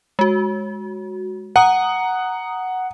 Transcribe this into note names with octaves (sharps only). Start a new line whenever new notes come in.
G#3 F#4
F#5 A#5 D#6